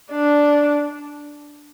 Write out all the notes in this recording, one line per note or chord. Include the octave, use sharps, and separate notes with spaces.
D4